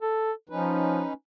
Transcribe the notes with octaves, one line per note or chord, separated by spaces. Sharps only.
A4
F3 C#4 D#4 B4